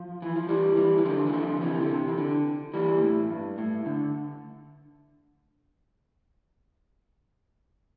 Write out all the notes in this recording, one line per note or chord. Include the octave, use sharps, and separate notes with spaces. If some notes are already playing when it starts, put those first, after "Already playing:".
Already playing: F3
E3
F3
E3 G3
E3 G3
E3
D3 F3
E3
D3 F3
C3 E3
D3
C3
E3
D3
E3 G3
B2
A2
G2
A2
D3